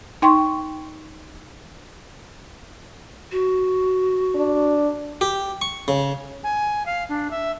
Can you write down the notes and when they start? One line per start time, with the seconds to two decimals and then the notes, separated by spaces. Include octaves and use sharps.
0.22 D#4 G5 C6 C#6
3.32 F#4
4.35 D4
5.21 G4
5.62 C#6
5.88 C#3
6.44 G#5
6.86 F5
7.09 D4
7.31 E5